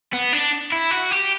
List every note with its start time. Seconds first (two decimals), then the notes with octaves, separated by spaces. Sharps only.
0.13 B3
0.33 D4
0.72 E4
0.91 F#4
1.11 G4